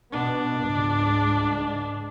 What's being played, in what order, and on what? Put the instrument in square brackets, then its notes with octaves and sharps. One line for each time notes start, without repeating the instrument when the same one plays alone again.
[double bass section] B2 B3 [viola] D4
[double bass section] C#2 G#2 G#3